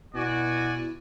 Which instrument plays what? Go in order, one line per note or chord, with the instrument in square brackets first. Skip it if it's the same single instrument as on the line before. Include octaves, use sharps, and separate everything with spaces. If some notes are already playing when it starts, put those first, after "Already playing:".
[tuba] B2 [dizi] E4 [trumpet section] F#4 D5 G#5